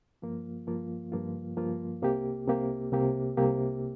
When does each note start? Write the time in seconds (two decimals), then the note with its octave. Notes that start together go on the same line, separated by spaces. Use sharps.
0.22 G2 F3 A#3 F4
0.67 G2 F3 A#3 F4
1.12 G2 F3 A#3 F4
1.57 G2 F3 A#3 F4
2.02 C2 C3 A#3 G4
2.47 C2 C3 A#3 G4
2.92 C2 C3 A#3 G4
3.37 C2 C3 A#3 G4